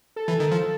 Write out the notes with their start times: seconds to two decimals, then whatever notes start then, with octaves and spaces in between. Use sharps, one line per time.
0.16 A4
0.28 E3
0.40 D#3
0.52 F3